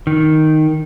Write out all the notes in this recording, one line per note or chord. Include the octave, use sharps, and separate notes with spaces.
D#3